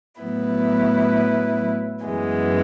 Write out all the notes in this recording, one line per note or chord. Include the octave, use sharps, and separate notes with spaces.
A2 F#3 B3 E4 B4
F#2 E3 G#3 B3